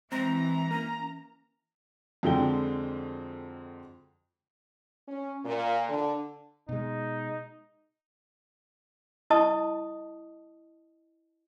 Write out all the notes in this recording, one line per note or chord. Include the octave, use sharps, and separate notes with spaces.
E3 G#3 C4 A#5
A#3 C#4
F2 D3 F#3 G#3 G5 G7
C#4
A#2
D3
B2 G#3 D#4
E4 D#5 A5 C#6 D#6